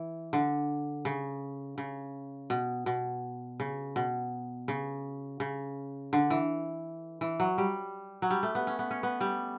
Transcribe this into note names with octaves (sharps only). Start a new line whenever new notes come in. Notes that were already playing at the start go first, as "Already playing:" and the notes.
Already playing: E3
D3
C#3
C#3
B2
B2
C#3
B2
C#3
C#3
D3
E3
E3
F#3
G3
F#3
G3
A3
B3
C#4
B3
C#4
B3
G3